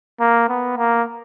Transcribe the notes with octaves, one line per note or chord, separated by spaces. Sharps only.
A#3
B3
A#3